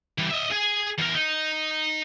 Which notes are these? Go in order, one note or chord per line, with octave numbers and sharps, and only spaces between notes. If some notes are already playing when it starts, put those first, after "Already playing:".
E3 G3
D#5 E5
G#4 G#5
E2 A#4
D#4